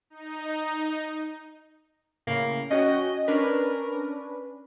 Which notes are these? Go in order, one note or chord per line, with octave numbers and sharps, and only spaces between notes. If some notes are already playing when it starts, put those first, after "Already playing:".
D#4
A2 C#3 A#3
C#4 F#4 D#5 G5
C#4 D4 A#4 B4